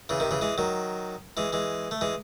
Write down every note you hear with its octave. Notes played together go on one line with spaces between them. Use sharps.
C#3 E3
C3 D#3
C#3 E3
E3 G#3
D#3 F#3
E3 G#3
E3 G#3
A3
E3 G#3